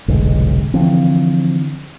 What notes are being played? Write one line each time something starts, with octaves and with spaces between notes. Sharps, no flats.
F1 B1 G#2 D3 G#3
D3 E3 F3 C4